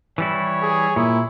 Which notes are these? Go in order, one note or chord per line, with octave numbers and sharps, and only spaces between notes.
E3 G3 E4 C#5
G#4
A#2 E4